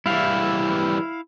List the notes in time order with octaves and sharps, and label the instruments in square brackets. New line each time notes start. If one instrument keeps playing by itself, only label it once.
[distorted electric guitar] E3 G3 [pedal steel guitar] E4 F5